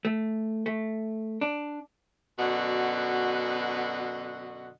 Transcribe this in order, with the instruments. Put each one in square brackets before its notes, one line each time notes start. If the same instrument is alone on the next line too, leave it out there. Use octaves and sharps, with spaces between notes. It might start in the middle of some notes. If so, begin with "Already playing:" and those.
[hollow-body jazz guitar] A3
A3
D4
[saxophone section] F#2 B2 D3 F#4 D#5 F#5